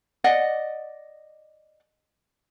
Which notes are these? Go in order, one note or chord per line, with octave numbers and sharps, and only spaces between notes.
D5 D#5 F#5